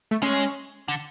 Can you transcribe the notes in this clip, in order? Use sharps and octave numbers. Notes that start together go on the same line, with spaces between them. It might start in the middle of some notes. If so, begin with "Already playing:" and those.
A3
G#3 C#4
D3